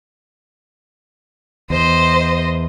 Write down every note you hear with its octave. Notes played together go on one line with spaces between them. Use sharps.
E2 C5 D#5